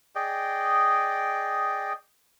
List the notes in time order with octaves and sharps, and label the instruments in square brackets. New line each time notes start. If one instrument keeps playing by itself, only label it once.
[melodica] G#4 D5 D#5 G5